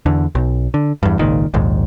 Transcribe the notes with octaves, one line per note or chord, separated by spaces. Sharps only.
E2 D3
B1
D3
E2 G2
G#1 C#2 A#2 D#3
A#1 D#2 G#2